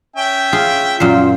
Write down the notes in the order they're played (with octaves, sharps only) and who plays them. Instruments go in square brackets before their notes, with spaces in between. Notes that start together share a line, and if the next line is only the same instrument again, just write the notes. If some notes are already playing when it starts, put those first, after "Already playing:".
[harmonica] C#4 E5 G5
[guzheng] F4 G#4
[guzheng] F#2 A#2 C5 [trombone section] F4